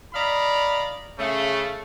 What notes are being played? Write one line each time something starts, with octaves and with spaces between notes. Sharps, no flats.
D5 D#5 F5 A#5 B5
C#3 A3